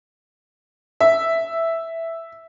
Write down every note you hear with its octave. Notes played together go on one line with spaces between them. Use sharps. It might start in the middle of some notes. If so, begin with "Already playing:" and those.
E5